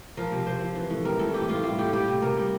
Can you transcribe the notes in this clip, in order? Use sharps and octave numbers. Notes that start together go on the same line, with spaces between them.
F3 A#4
C3
C3 C5
F3
E3
A2
G3 A#4
A2 A4
E3 G4
A2 F4
G3 F4
A2 G4
G3 G4
C3
C3 A#4
G3